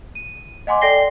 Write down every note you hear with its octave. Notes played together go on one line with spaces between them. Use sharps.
D#7
D#5 F#5 G#5 C6 D6
A4 D5 G5 A#6 C7 G7